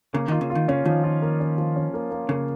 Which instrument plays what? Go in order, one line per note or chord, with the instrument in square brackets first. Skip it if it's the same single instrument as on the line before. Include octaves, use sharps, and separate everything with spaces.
[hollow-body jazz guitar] C#3 [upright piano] A#3
[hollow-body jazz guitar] D#3 [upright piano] F4
[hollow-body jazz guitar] C#3
[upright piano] F4
[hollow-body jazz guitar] D#3
[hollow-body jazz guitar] C#3 [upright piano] C#4
[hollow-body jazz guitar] D#3 [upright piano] F3
[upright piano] F4
A#3
C#4
F3
C#4
A#3
A#3
[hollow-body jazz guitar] C#3 [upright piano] A#3